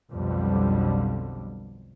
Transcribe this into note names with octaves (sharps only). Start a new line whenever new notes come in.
B1 F2 B2 D3 G3